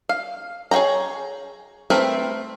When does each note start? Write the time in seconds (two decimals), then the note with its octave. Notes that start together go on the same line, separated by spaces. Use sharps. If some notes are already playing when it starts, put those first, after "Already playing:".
0.09 F5
0.71 G#4 C#5 F5 G5 A#5
1.90 A3 C4 A#4 B4